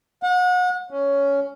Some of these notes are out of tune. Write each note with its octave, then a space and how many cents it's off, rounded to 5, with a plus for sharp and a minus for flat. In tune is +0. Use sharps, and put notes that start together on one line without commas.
F#5 -35
C#4 +10